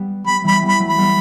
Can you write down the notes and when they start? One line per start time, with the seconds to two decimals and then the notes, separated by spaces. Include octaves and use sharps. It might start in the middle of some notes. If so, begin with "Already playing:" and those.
Already playing: G3 B3
0.27 G3 B3 B5
0.44 E3 G3 B5
0.62 G3 B3
0.69 B5
0.79 F#3 A3
0.89 B5
0.97 G3 B3